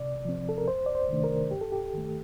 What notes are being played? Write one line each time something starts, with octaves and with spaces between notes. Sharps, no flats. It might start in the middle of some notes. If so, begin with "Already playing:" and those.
Already playing: C3 D5
F3 C4
A4
A#4
F2 C5
D5
C5
C3 D#3 A3 D4
A#4
G2 G4
A4
G4
D#3 A3